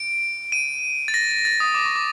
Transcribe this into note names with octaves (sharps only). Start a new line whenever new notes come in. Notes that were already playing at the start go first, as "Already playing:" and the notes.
Already playing: D7
D#7
A6
A#6
A6
A6
D#6
D6
C#6
D6